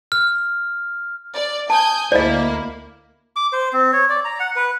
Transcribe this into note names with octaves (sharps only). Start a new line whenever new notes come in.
F6
D5
G#5 A5 D#6 G6
D2 A#3 E4 D5 D#5
D6
C5
C4
C#5
D5
A#5
F#5
B4